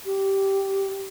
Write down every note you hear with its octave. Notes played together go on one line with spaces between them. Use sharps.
G4